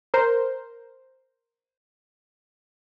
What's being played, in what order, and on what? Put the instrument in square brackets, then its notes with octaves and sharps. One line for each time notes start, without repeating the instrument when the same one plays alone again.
[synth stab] A#4 C5